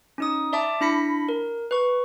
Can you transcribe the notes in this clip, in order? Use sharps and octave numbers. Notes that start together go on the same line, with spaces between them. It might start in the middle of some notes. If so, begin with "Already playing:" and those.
C#4 D#4 D#6
D5 E5 A5 D6
D4 E4 B5 A#6 B6 C#7
A#4
B4 C#6